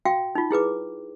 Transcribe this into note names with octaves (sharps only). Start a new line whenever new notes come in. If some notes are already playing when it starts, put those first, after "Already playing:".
F#4 F5 G5
D#4 F4
E4 G#4 B4 D6